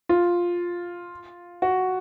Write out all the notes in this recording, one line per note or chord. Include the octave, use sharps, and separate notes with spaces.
F4
F#4